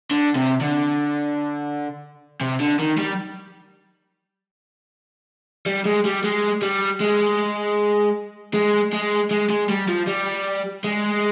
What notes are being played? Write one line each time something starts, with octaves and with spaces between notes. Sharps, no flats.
D3
C3
D3
C3
D3
D#3
G3
G3
G#3
G3
G#3
G3
G#3
G#3
G#3
G#3
G#3
G3
F3
G3
G#3